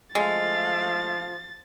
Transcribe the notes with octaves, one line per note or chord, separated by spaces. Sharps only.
F3 G#3 A3 F5 A6